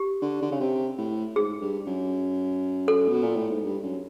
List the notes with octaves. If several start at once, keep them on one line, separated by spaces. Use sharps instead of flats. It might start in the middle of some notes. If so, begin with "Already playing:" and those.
Already playing: G4
D3
D3
C#3
C3
A2
G#2 G#4
G2
F#2
A4
B2
A#2
A2
G#2
G2
F#2